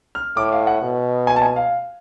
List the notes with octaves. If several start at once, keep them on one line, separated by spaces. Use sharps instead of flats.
F6
A2 D6
F5
F#5
B2
G#5
A5
G#5
F5